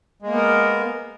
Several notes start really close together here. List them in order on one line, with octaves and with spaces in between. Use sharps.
G#3 A#3 B3 A#4